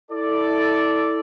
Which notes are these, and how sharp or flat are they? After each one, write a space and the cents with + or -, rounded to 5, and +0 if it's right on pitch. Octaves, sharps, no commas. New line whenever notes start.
E4 -25 A4 +0 D5 -5